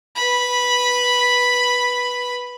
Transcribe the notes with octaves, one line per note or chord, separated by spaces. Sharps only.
B4 B5